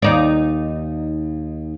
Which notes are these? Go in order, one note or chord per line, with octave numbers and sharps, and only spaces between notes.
D#2 D#4 D5